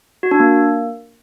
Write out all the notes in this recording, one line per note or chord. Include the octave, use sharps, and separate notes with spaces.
F#4
D4
A#3